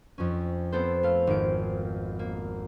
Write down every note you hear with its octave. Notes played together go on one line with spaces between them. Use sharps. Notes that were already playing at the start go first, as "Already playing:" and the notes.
F2 C#4
B3 C4 A4 C5
A3 F5
G#1 D7
A#3